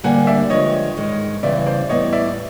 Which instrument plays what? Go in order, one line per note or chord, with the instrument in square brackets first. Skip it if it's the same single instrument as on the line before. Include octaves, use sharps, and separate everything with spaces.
[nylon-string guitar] D2 D3 G3 A#3 D4 [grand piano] F#5 G#5
[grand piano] D5 E5
[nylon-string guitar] G2 D3 F3 G#3 [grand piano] C#5 D#5
[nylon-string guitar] G#2 D#3 G#3
[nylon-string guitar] E2 C#3 E3 G3 [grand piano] D5 E5
[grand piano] C5 D5
[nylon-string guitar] A2 E3 G3 B3 [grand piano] C#5 D#5
[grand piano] D5 E5